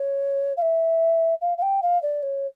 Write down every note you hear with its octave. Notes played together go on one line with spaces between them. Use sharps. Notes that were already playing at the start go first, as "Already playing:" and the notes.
Already playing: C#5
F5
E5
F5
F5
G5
F5
D5
C#5